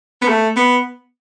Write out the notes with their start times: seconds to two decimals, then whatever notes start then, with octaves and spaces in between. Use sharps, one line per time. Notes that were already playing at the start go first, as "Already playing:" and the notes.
0.21 B3
0.28 A3
0.56 B3